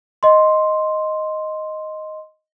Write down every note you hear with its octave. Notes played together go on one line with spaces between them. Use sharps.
D#5 C6